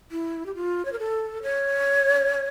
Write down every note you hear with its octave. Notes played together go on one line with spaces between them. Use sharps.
E4
G4
F4
C#5
A#4
A4
C#5